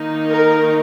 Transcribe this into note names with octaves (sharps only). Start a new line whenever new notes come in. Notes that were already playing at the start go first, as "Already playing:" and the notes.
Already playing: D#3 A#3 D#4
A#4